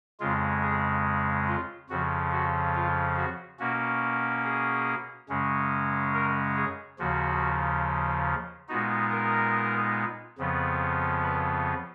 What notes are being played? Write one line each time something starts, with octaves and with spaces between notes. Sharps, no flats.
F2 C#3 G#3 F4
G#4
F4
F2 C#3 F3 F#4
F#4
F4
F#4
B2 A#3 C#4 F#4
G#4
F#2 C#3 G#3 C#4
A#4
G#4
D#2 C#3 F3 F#4
A#2 G#3 B3 D#4 F#4
A#4
F2 C#3 F3 B3
B4